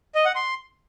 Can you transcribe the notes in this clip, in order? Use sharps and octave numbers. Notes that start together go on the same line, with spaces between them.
D#5
F#5
C6